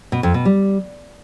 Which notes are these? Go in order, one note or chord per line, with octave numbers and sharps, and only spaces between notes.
B2
F2
B2
G3